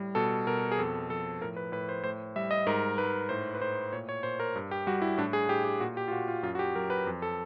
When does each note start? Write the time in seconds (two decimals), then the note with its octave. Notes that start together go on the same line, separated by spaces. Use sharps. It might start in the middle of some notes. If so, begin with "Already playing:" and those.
Already playing: A2 G3
0.15 B2 A4
0.47 B2 A#4
0.72 G#4
0.78 F2 A4
1.10 F3 A4
1.41 A2 A#4
1.56 B4
1.72 A2 B4
1.89 C5
2.03 A2 C5
2.36 G3 E5
2.51 D#5
2.67 G#2 A#4
2.98 G#2 B4
3.29 A2 C5
3.55 B4
3.60 A2 C5
3.93 A#2 C#5
4.09 C#5
4.23 A#2 C5
4.40 A#4
4.56 G2
4.71 G4
4.87 G3 F#4
5.02 E4
5.18 A2 D4
5.33 G#4
5.49 A2 G4
5.64 G4
5.80 A#2 F#4
5.97 G4
6.08 F4
6.12 A#2 F#4
6.28 F4
6.43 F#2 F4
6.55 F#4
6.59 G4
6.75 F#3 A#4
6.90 B4
7.07 F2
7.22 A4